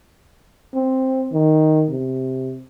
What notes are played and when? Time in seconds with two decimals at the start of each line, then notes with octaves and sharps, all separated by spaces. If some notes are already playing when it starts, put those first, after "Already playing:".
0.75 C4
1.33 D#3
1.90 C3